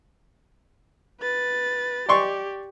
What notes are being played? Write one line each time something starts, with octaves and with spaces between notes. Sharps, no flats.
B4 A6
G4 D5 C6 C#6